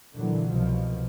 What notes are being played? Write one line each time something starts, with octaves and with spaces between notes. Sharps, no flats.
A#2 D3 E3 F#3
C2 B2 F3